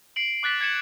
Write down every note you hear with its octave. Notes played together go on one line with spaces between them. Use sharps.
C7 D7 F#7
D6 F#6 A6 B6 F#7
G#6 A6 C#7 E7 F#7